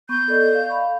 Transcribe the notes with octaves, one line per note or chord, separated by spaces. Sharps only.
B3 C#6 G6
A4 D5 D#5
F5
F5 B5 C#6